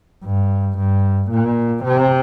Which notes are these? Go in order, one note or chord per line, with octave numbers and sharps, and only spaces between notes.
G2
G2
A#2
C3